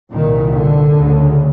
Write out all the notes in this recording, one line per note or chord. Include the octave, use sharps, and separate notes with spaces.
C2 A#2 D#3
D3
D2 C#3